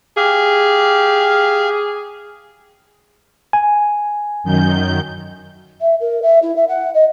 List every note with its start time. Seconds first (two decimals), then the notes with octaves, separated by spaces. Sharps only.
0.17 G4 G#4 F5
3.53 G#5
4.43 F#2 D#3 G6
5.81 E5
6.00 A#4
6.22 E5
6.42 E4
6.56 E5
6.68 F#5
6.94 D#5